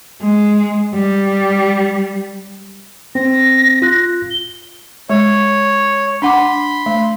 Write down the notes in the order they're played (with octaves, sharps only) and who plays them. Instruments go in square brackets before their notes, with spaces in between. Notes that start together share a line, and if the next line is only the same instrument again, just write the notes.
[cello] G#3
G3
[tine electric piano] C4 [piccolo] A#6
[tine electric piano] F4 F#6
[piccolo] G7
[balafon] G#3 [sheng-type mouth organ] C#5
[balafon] D4 F#5 D6 [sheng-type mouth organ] B5 C6
[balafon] A3